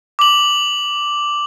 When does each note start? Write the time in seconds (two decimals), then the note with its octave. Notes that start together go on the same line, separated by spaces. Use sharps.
0.19 D6 F#7